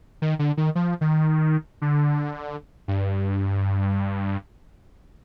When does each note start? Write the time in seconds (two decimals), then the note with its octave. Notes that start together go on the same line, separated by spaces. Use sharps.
0.22 D#3
0.39 D3
0.57 D#3
0.75 F3
1.01 D#3
1.82 D3
2.88 G2